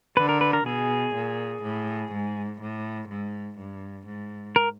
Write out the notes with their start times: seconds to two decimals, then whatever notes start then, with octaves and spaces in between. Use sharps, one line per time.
0.17 D3 B4
0.29 A#4
0.41 B4
0.53 A#4
0.65 B2 G#4
1.14 A#2
1.63 A2
2.12 G#2
2.61 A2
3.09 G#2
3.59 G2
4.07 G#2
4.56 A#4